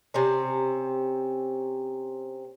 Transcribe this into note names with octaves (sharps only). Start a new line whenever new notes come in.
C3 C4 C#4